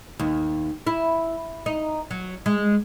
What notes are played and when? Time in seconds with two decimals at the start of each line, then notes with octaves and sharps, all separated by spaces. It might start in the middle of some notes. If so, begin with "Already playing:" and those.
0.19 D#2
0.87 E4
1.66 D#4
2.11 F#3
2.46 G#3